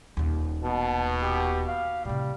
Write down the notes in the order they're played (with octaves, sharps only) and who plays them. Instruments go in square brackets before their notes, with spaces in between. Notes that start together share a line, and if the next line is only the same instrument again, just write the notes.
[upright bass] D#1 D#2
[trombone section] B2 [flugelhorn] A5
[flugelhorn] G4
F5
[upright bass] A2 C3 [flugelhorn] G3